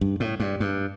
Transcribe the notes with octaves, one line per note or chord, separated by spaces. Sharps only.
G2
A2
G2
G2